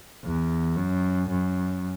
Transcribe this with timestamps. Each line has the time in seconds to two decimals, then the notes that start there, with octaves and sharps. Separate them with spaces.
0.24 E2
0.77 F#2
1.30 F#2